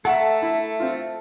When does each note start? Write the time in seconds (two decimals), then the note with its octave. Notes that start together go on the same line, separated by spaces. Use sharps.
0.05 A3 A4 A#4 E5 F#5 C#6
0.42 E4
0.80 C4 F4